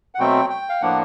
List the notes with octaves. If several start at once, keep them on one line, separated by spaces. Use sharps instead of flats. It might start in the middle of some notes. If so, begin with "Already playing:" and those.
F#5
B2 F#3 A3 C4 G5
G5
F5
A2 F3 A#3 D4 F#5